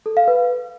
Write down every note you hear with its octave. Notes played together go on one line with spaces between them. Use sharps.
A4
F5
B4